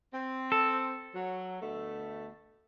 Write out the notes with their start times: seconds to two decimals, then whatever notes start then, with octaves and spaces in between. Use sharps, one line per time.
0.13 C4
0.52 A4
1.15 F#3
1.62 D2 B2 A3